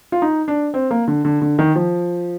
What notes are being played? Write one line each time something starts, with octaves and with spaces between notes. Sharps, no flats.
F4
D#4
D4
C4
A#3
D3
D3
D3
D#3
F3